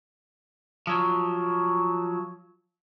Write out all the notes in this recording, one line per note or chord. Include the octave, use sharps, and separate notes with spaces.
F3 F#3